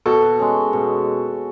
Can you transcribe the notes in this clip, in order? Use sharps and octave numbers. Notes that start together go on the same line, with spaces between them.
B2 F#4 A4
G#3 C#4
B2